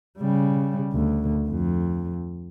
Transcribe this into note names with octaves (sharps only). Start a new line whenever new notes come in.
C#3 G3
D2
F2